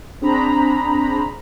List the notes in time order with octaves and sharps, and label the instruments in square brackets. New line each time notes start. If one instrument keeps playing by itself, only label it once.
[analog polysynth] C4 D4 G#4 C5 A#5 B5